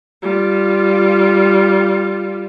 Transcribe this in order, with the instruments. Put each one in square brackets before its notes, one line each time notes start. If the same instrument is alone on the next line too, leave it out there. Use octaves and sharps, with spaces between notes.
[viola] G3 F4